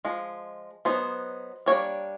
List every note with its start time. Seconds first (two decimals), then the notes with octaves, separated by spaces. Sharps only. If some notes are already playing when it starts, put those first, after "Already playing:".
0.05 F3 G#3
0.85 F#3 B3 D#4 C5
1.66 G3 A#3 D4 C#5